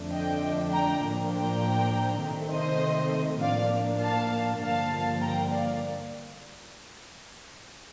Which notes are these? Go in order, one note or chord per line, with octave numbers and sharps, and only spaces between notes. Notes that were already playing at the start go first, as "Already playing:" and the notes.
Already playing: F2 D3 F3 A3 D4
D#5 G5
G5 A#5
A2 F3 A#3 D4
G5 A#5
C3 D#3 A3 C4
C5 D#5
A2 F3 A#3 D4 D5 F5
F5 A5
G2 D3 F3 A#3 F5 A5
G5 A#5
D5 F5